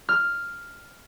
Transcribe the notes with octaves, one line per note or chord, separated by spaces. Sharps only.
F6